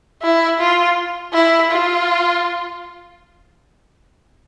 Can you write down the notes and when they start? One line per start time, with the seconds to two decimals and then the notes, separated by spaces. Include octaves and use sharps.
0.23 E4
0.60 F4
1.34 E4
1.71 F4